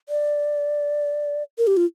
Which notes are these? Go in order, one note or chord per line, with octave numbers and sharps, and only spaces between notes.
D5
A#4
G4
F4